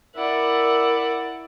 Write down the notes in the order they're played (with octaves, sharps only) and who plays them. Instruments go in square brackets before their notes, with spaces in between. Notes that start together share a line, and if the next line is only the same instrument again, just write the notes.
[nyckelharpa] E4 E5 [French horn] A#4 [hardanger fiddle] D5 F#5